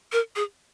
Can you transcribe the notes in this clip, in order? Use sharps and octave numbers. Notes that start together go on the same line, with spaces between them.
A#4
G#4